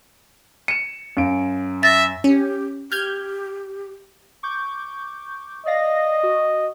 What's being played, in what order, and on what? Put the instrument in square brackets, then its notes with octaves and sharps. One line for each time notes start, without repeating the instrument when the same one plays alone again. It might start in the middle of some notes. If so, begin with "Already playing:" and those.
[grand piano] C#7 E7 [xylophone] D#7
[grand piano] F#2 F5 D7
[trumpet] E5 [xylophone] A6 A#6
[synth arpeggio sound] C#4 [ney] G4
[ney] G4 [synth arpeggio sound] F6 G6 G#6
[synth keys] C#6 D6 G6
[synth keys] D5 F5 A#6 [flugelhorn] D#5
[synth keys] F#4